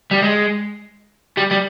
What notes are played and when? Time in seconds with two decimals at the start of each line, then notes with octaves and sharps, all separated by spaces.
0.11 G3
0.22 G#3
1.37 G3
1.51 G3